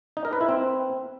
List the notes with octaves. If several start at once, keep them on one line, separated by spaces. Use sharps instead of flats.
D#4
A#4
B4
E4
C4